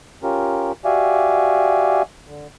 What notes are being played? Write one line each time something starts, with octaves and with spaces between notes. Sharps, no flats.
C#4 F4 G4 A#4
F#4 G4 D5 E5 F5 G#5
D3